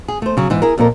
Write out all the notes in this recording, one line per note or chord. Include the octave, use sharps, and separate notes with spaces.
G#4
A3 C5
C#3 F#3
G#2 E3
E4 G#4 A#4
F2 A#2 A4 A#4